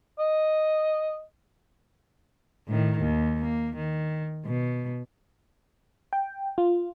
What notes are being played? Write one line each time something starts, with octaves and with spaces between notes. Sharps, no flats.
D#5
A2 D#3
D#2
A#3
D#3
B2
G5
F4